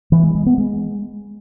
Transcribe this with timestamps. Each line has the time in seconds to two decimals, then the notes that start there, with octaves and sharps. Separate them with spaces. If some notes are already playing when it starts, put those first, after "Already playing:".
0.12 E3
0.23 G#3
0.35 G#3
0.46 B3
0.58 G#3